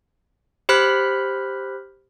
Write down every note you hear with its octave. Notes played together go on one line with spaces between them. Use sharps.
G4 C5 B5 F6 F#6 B6